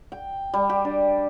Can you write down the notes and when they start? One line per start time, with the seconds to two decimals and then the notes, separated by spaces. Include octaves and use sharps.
0.12 G5
0.54 G3
0.70 G4
0.85 D4